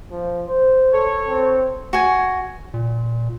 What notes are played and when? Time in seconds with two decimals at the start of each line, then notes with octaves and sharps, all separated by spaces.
0.11 F3
0.48 C5
0.93 A4 C#5
1.28 C4
1.93 F#4 G#5
2.74 A#2